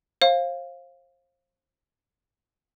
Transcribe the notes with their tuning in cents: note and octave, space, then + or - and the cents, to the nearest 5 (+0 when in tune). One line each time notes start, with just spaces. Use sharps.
C5 +35 F5 +0